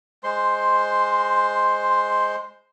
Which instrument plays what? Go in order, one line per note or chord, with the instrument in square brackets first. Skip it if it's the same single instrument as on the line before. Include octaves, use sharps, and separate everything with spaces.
[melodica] G#3 C5 C6